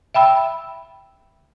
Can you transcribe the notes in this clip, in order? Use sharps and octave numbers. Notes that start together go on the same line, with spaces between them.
E5 G5 B5 E6